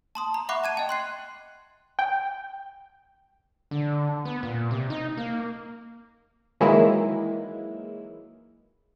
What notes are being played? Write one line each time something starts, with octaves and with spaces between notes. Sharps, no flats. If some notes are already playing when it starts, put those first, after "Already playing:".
A5 C6 D#6
A#5
E5 F#5 B5 C#6 D6 F#6
A5 G#6 D#7
D#5 G5
C6 F#6 C7
G5
D3
B3
A#2
C3
D#4
A#3
D#3 E3 F#3 G#3 A#3 E4